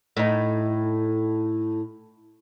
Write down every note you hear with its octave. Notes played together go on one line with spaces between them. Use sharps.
A2 D#4